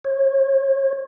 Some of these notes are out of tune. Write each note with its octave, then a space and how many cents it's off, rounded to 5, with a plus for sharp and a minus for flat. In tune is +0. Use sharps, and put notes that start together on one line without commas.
C#5 -35